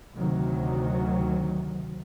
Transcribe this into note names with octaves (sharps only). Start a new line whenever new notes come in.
D2 C3 D#3 F#3